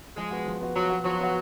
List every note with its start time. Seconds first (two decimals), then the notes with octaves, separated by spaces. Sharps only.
0.16 F3 G#3
0.31 B3 F#4
0.46 F3
0.61 B3 F#4
0.75 F3 F#3
0.90 B3 F#4
1.04 F3 F#3
1.20 B3 F#4